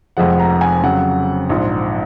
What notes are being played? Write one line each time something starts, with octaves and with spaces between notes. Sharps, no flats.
F1 F2 F3 G#3 F#5
A#5
G#5
F2 C#3 F#3 F#5
A#1 G#2 F3